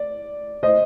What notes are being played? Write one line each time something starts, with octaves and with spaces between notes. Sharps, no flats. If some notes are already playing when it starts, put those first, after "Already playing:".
Already playing: D5
C5 D#5